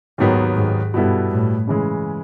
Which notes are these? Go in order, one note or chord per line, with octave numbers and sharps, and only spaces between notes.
D#2 G#2 D#3 F#3 B3
G#2
G2 B2 G3 B3 E4 A4
A2
C#3 E3 G#3